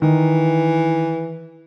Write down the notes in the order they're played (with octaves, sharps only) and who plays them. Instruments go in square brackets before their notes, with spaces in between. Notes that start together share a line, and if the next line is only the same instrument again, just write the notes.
[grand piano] D#3 [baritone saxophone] E3